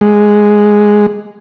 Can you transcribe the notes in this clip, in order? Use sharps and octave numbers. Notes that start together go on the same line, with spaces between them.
G#3